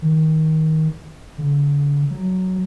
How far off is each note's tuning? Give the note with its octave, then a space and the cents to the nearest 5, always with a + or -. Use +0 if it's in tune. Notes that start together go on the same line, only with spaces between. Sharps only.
D#3 +20
D3 -40
F#3 +5